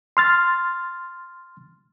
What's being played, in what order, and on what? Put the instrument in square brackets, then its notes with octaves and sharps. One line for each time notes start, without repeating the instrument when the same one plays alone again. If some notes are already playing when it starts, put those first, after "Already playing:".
[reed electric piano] C6 F6 A6